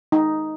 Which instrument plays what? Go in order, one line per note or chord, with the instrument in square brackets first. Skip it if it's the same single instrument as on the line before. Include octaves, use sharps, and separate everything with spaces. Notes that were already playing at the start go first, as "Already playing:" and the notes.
[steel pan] D#4